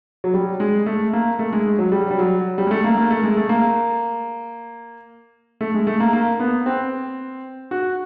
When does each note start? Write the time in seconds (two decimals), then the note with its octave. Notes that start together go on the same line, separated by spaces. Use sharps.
0.24 F#3
0.34 G3
0.60 G#3
0.86 A3
1.13 A#3
1.39 A3
1.53 G#3
1.66 G#3
1.79 F#3
1.92 G3
2.11 G3
2.18 F#3
2.58 G3
2.67 G#3
2.71 A3
2.84 A#3
2.97 A#3
3.11 A3
3.23 G#3
3.37 A3
3.49 A#3
5.61 A3
5.74 G#3
5.87 A3
6.00 A#3
6.13 A#3
6.40 B3
6.66 C4
7.71 F#4